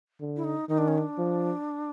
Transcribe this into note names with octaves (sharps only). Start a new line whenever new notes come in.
D3
E4
D#4
D#3 D#4
D4
C#4
D4
F3